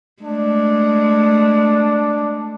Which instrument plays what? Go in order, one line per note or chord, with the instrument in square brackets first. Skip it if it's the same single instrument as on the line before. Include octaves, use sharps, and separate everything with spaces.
[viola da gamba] G#3 A3 [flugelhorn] D4